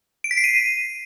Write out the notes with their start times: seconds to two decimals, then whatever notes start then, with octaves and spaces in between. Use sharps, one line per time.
0.24 D7
0.31 B6
0.37 C7
0.44 D#7